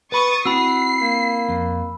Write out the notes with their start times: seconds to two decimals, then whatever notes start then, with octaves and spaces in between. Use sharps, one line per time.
0.12 B4 B5 C#6 D#6 A6
0.45 C4 E4 F#4 B5 E6 C7
1.01 A#3
1.49 F2